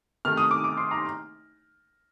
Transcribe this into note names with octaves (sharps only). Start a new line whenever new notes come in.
C3 D#3 A3 F6
D#6
D6
D6
C6
A#5